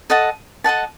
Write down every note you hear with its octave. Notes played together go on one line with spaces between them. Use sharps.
A4 D#5 F#5 A5
A4 D#5 F#5 A5